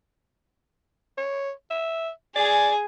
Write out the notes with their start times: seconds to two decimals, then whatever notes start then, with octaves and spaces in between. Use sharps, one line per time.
1.18 C#5
1.70 E5
2.36 G#4 D5 G#5